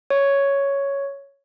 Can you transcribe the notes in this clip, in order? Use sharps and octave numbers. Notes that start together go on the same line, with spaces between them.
C#5